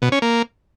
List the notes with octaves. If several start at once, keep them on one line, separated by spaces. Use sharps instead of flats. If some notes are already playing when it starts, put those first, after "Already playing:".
B2
C#4
A#3